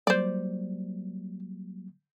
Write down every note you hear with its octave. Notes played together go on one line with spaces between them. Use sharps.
F#3 G3 A#3 C5 D5